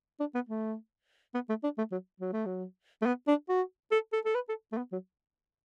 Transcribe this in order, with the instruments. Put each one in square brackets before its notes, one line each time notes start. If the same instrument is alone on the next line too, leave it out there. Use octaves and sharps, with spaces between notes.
[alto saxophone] D4
B3
A3
B3
A3
D4
A3
F#3
F#3
A3
F#3
A3
B3
D4
F#4
A4
A4
A4
B4
A4
A3
B3
F#3